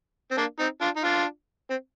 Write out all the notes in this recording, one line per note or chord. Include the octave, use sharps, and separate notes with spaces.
C4
A#3 D4
C4 D#4
D4 F4
D#4
D4 F4
C4